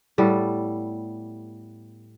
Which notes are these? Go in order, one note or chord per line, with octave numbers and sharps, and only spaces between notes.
A2 G3 B3 A4